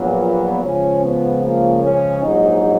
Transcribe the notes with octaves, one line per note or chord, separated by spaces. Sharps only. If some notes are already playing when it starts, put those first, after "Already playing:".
Already playing: A#1 A#2 F#3 B3
C#2 C#3 F3 C#4
B3
A#3
C#4
A#1 G#2 F#3 D#4